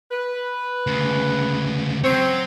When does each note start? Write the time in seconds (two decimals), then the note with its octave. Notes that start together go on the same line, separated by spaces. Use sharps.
0.11 B4
0.87 D2 C#3
2.04 F#3 C4 C#5